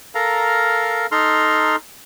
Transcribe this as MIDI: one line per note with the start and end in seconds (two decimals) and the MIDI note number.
0.15 1.06 69
0.15 1.06 70
0.15 1.06 77
0.15 1.06 82
1.12 1.76 63
1.12 1.76 69
1.12 1.76 82
1.12 1.76 84
1.12 1.76 89